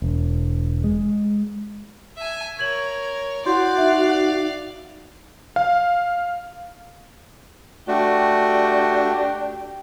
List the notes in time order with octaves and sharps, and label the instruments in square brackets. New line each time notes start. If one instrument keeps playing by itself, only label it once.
[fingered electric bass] E1
G#3
[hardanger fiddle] E5 G#5
[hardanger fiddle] A#4 C#5 [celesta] G#6 F#7
[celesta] E4 C6 G6 [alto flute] F#4 [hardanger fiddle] D5 F5
[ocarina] D#4 [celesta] E5
[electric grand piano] F5
[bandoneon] A3 F#4 [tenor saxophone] D4 [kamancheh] G4